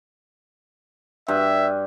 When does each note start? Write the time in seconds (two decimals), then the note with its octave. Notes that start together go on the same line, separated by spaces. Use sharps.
1.28 G2 E5